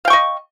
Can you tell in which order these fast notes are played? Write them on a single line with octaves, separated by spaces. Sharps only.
F5 G5 C#6 D#5